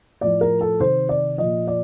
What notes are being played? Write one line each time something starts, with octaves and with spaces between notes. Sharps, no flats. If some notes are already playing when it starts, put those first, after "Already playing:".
A2 F3 D5
A#4
A4
C3 D#3 C5
D5
A#2 F3 D#5
D5